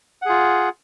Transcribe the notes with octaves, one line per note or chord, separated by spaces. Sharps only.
F4 G#4 F#5